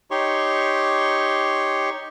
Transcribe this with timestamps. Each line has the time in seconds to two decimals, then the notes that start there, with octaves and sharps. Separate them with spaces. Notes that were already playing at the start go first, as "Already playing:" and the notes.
0.11 D#4 G4 C#5 C6 C#6